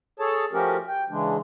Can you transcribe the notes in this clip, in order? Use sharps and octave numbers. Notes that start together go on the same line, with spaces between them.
G#4 A4 C#5 A5
F3 A3 C#4 F#4 G4 A#4
G5
C#3 E3 G#3 D4